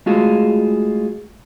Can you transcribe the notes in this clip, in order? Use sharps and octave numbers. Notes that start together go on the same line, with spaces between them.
G#3 A3 F4 F#4 G#4